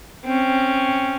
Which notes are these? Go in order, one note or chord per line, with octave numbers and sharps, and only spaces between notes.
C4 C#4